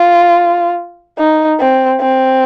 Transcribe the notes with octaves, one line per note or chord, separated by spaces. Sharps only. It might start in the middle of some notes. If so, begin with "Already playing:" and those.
Already playing: F4
D#4
C4
C4